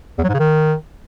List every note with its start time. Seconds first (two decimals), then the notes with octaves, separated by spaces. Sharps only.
0.18 E2
0.24 F#3
0.29 G#2
0.34 C#3
0.39 D#3